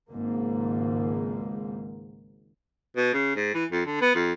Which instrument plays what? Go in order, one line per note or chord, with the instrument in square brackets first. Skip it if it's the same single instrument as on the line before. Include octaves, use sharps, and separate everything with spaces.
[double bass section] G#1 C#2 G#2 A#3
[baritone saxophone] B2
C#3
G#2
E3
F2
D3
B3
F2